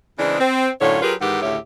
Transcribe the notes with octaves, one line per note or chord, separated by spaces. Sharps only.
C#3 E3 G#3 C4 D4
C4
F#2 A2 D3 F4 C#5
F#3 F4 G4 G#4 A#4 B4
G#2 D#3 E3 G4 F#5
D2 A2 C#3 G4 C#5 E5